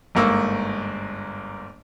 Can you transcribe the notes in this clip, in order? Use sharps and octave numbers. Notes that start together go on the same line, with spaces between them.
G1 G#2 A#3 C#6 E6